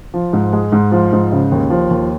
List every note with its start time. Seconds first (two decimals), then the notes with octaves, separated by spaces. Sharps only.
0.14 F3
0.33 G#2
0.53 G#3
0.72 G#2
0.92 F3
1.13 G#2
1.32 C#3
1.52 D#2
1.70 F3
1.90 D#2